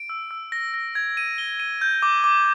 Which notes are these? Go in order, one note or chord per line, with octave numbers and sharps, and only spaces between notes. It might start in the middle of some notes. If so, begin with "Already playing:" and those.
Already playing: D7
E6
E6
A#6
A#6
G#6
D#7
G7
D#7
G6
D6
D6